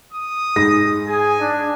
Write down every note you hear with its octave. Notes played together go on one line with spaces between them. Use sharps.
D#6
G#2 A#6
G#4 G#5
D4